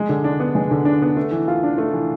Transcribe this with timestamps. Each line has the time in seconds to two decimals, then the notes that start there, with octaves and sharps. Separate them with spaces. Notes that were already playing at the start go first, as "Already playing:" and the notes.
Already playing: G#3
0.09 D3
0.24 D4
0.40 B3
0.55 G#3
0.71 D3
0.85 D4
1.02 B3
1.17 A3
1.31 E3
1.48 F4
1.63 D4
1.78 A3
1.93 E3